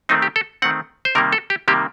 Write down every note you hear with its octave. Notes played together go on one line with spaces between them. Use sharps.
D#3 A3 C4 D#4
G4
A4
D#3 A3 C4 F#5
C5
C3 D#3 G3 A#3 A#4
A4
G4
C3 D#3 G3 A#3 G4